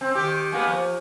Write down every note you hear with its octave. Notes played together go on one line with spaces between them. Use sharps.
C4
D#3 G4
G#3 A#3 B3
F3